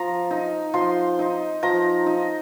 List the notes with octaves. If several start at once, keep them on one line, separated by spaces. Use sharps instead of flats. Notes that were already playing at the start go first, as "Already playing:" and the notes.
Already playing: F3 A#5
D#4
F3 C6
D#4
F3 A#5
D#4